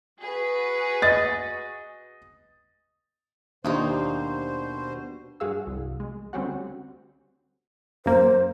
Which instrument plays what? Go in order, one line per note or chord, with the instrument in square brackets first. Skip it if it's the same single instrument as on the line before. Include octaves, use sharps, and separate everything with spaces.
[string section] F#4 G#4 B4
[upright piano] D#5 A6
[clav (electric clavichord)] D#2 [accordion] B2 C5 [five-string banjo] F3 A#3 D#4 [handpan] D4 G4
[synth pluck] G2 F#4 G#4 F5 E6
C2
G#3
D2 G3 C4 C#4 F#4 F#5
[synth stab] F#2 A#3 [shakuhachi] C5